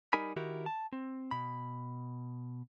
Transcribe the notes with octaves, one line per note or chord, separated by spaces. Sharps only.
G3 D#4 A#4 G#5 B5
D#3 E4 F#4 G4 A#4
A5
C4
B2 B5